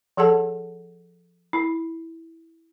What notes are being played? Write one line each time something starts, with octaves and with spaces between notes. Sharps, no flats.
F3 G#4 A4 F#5 A5
E4